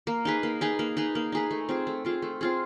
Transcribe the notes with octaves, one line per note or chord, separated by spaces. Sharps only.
A#3
D#4 G#4 B4
A#3
D#4 G#4 B4
A#3
D#4 G#4 B4
A#3
D#4 G#4 B4
A3
C4 F4 G#4
A3
C4 F4 G#4
A3
C4 F4 G#4